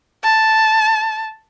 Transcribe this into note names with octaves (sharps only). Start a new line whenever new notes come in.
A5